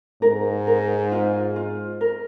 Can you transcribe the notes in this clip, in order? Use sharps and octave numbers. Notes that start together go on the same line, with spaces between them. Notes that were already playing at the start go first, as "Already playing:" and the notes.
G#2 A#4
A#4
F4
F4
A#4